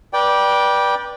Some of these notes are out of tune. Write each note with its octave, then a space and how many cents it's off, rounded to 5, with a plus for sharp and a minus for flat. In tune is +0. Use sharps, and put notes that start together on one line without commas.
B4 -35 D5 +0 G5 +0